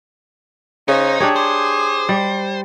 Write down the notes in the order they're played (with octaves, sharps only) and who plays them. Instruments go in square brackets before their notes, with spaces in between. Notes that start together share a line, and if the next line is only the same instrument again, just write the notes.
[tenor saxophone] C#3 [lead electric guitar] D#4 [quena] C5
[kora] D4 G4 C#5 [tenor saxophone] G#4
[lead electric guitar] C5 [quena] D6
[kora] G3